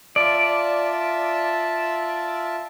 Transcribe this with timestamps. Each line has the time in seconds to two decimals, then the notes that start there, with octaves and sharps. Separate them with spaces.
0.16 F4 D5 E5 A5